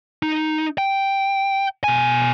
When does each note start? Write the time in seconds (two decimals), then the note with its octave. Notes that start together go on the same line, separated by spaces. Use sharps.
0.23 D#4
0.78 G5
1.84 B2 G#5